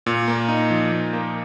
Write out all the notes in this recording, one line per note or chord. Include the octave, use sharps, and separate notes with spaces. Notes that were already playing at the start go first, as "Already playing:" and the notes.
A#2
A#3
D#4
F3
A#2
A#3